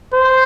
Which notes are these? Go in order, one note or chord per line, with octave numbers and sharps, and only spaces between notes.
C5